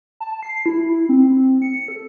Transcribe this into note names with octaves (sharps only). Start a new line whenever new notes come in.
A5
C7
E4
E4
C4
C#7
A4